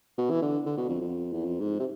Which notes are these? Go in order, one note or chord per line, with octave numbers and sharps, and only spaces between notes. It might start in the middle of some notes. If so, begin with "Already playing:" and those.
B2
E3
D3
D3
B2
F2
F2
E2
F2
G#2
C3